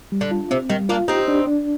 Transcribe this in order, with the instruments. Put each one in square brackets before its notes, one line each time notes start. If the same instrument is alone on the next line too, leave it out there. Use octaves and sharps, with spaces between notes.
[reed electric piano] G3
[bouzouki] D3
[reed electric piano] F4
[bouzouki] C3 [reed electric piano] C4
[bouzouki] D#3 [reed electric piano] G3
[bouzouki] A#3 D4 [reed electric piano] F4
[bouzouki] C4 D#4 [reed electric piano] G4
[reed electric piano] D4
D4